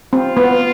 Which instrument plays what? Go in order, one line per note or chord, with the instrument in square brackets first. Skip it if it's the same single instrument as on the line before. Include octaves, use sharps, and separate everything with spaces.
[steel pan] C4 [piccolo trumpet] F4
[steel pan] B3